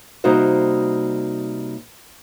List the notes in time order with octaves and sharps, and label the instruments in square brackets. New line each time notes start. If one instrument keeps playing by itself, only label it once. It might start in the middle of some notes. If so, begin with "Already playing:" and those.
[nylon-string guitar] C3 G3 A#3 D#4 F#4 C5